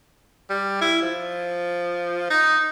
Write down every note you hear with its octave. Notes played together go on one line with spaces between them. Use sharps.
G3
E4
F3
D#4